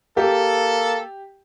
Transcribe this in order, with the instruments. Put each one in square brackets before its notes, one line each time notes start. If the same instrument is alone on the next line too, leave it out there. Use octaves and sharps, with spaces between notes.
[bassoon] A#3 [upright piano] G4 [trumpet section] A4